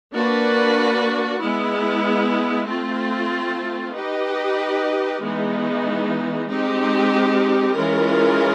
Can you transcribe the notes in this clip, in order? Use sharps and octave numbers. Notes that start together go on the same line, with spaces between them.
A#3 D4 F#4 B4
G#3 B3 E4
A3 C4 F4
D#4 G4 B4 D#5
E3 G#3 B3 D#4
G#3 C4 D#4 G4
E3 G#3 C#4 F4 A#4